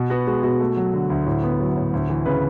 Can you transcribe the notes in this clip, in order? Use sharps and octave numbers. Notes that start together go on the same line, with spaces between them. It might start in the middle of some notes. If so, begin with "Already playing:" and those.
Already playing: B2
B3 F#4
G#3 F#4
B2 F#4
A3
F#3
D3
D2
A2
B3
F#3
A2
D2
E3
C#3 B4